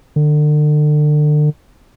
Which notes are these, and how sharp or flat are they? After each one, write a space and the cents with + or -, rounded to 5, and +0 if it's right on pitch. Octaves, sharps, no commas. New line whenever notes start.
D3 +35